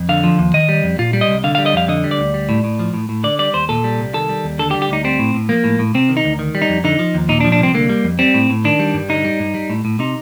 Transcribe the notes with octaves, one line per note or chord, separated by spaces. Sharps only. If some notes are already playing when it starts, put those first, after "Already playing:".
Already playing: F2
D3 F5
F3
D#2
D#3 D#5
G3
F2
A#2 F4
G3
D#5
C2
D3 F5
F5
G3
D#5
F2 F5
D3 D#5
G3
D5
D2
G3
A2
A2
F3
A2
A2
D3 D5
G3 D5
D#2 C5
A#2 A4
G3
C2
D#3 A4
G3
D#2
D3 A4
G4
G3
G4
D2 D#4
G3 C4
A2
A2
F3 A#3
A2
A2
C3 C4
D#3
D#4
D2
D#3
G3
D#4
F2
D3 D#4
F3
D#2
A#2 D#4
D4
F3
D4
C2 C4
D3 A#3
G3
F2
G3 C4
A2
A2
D#3 D4
G3
G2
D3 D#4
G3
G2
G3
A2
A2
C3 D#4